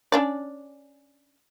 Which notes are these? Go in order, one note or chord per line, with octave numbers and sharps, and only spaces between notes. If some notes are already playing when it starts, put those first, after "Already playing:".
C#4 D4 D5